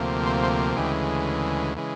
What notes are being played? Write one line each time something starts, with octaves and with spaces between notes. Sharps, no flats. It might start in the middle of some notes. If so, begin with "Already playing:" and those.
Already playing: D2 C3 F3 A#3
C5
C5
D2 C#3 E3 G#3 G4
C#3 E3 G#3